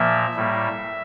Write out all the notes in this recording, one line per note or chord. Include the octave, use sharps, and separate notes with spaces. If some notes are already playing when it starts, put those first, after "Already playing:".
Already playing: A#2 F3 A#3 E5
A2 G3 A#3